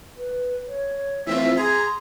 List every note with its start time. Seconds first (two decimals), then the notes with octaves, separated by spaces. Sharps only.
0.17 B4
0.67 C#5
1.27 E3 A3 C4 F4 E5
1.57 G#4 A#5 C6